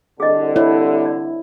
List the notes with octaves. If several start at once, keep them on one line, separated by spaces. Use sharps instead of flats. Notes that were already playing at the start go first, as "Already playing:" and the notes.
C2 D3 G#4 D#5
E4 C#5
D5